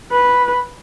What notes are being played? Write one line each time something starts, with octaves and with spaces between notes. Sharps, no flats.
B4